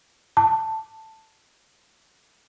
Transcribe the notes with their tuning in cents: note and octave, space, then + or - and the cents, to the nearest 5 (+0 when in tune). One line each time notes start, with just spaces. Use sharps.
A5 +5